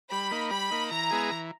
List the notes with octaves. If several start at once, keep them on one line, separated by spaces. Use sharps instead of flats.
G3 B5
A#3 D#4
G3 B5
A#3 D#4
E3 A#5
G#3 B3 E4 G#4
E3